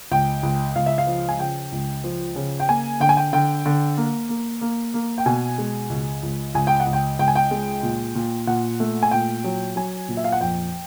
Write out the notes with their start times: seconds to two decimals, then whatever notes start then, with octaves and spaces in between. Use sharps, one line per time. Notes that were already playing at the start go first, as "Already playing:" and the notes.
0.11 C#2 G5
0.43 C#2
0.76 C#2 F5
0.86 E5
0.98 F5
1.07 F3
1.29 G#5
1.39 C#3 G5
1.72 C#2
2.04 F3
2.36 C#3
2.60 G5
2.69 A#3 G#5
3.00 D3 G5
3.09 G#5
3.17 G5
3.33 D3 G5
3.66 D3
3.97 A#3
4.29 A#3
4.61 A#3
4.94 A#3
5.18 G5
5.26 B2 G#5
5.58 G#3
5.90 C#2
6.23 C#2
6.55 C#2 G#5
6.67 G5
6.80 F#5
6.86 C#2
6.93 G5
7.19 C#2 G5
7.28 G#5
7.35 G5
7.51 G#3
7.83 A#2
8.15 A#2
8.47 A#2 F#5
8.80 A3
9.03 G#5
9.11 A#2 G5
9.44 F#3
9.76 F#3 G#5
10.08 A#2
10.17 E5
10.24 F5
10.32 F#5
10.41 F2 G5